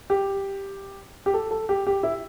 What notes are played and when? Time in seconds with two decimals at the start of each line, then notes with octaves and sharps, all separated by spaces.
0.10 G4
1.26 G4
1.34 A4
1.51 A4
1.69 G4
1.87 G4
2.03 E4